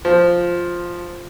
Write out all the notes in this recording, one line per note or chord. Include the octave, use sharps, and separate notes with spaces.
F3